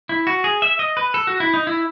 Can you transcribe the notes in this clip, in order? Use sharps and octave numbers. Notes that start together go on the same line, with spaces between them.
E4
F#4
G#4
E5
D#5
B4
A4
F#4
E4
D#4
E4